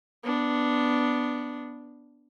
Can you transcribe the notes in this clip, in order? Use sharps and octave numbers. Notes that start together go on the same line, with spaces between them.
B3 D4